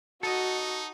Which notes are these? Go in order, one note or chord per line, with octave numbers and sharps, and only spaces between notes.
D#4 F#4 A4 D#5